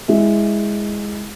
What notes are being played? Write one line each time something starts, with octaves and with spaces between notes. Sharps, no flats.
G#3 E4